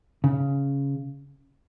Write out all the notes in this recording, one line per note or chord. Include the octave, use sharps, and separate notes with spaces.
C#3